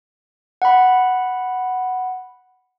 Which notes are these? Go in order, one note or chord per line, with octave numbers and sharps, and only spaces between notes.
F#5 B5